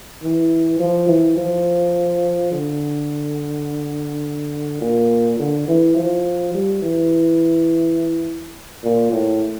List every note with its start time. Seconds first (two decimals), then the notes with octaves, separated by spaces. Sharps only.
0.23 E3
0.80 F3
1.08 E3
1.37 F3
2.52 D3
4.81 A#2
5.40 D3
5.68 E3
5.96 F3
6.55 G3
6.83 E3
8.84 A#2
9.12 A2